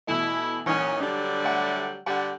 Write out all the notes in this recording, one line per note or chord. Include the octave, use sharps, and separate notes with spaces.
B2 E3 A3 E4
A#2 E3 F#3 C#4 D#4
D3 F#3 G3 D4
A3 F#5
D3 G3 F#5